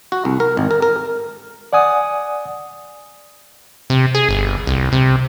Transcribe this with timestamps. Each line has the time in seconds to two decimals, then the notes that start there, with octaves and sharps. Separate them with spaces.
0.12 F#4
0.25 C2
0.40 A#4
0.57 G#1
0.71 A#4
0.82 A#4
1.73 D5 F#5 G#5 D#6
3.90 C3
4.15 G#4
4.29 G1
4.67 C2
4.92 C3